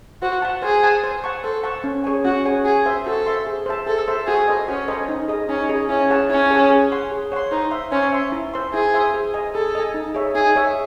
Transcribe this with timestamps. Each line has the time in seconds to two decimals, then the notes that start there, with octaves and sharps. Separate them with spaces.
0.22 F#4 C5
0.42 F#5 A5
0.62 G#4 C5
0.83 F#5 A5
1.03 C5
1.24 F#5 A5 C#6
1.44 A4 C5
1.63 F#5 A5 C#6
1.84 C#4
2.04 G#4 C#5 G#5
2.24 C#4 F#4
2.45 G#4 C#5 G#5
2.65 F#4 G#4
2.86 C5 E5 C6
3.06 F#4 A4
3.26 C5 E5 C6
3.47 G#4
3.66 C5 E5 A5
3.87 G#4 A4
4.08 C5 E5 A5
4.27 F#4 G#4
4.48 A4 C5 D#5
4.68 C#4 F#4
4.88 A4 C5 D#5
5.09 D#4
5.28 G#4 D#5
5.49 C#4 D#4
5.69 G#4 D#5
5.89 C#4 E4
6.10 G#4 C#5 F#5 A5
6.30 C#4 E4
6.50 G#4 C#5 F#5 A5
6.70 G#4
6.91 C#5 F#5 C6
7.12 G#4
7.32 C#5 F#5 C6
7.51 D#4 C5
7.71 E5 C6
7.92 C#4 C5
8.12 E5 C6
8.32 E4
8.54 C5 E5 C6
8.73 E4 G#4
8.94 C5 E5 C6
9.14 G#4
9.34 D#5 G#5
9.55 G#4 A4
9.75 D#5 G#5
9.94 D#4
10.15 G#4 C#5 E5
10.35 D#4 G#4
10.55 G#4 C#5 E5